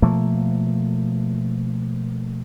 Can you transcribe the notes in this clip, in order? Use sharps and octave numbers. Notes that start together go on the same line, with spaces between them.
B2 F3 A3 A#3